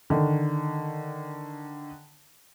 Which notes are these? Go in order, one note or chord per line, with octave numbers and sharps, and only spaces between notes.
D3 D#3